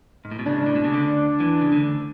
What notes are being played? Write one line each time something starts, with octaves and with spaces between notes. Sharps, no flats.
G#2
A2
B2
C#2 C#3 D4
G#2
A2
B2
C#3
D2 D3
E2 E3
C#3
D2 D3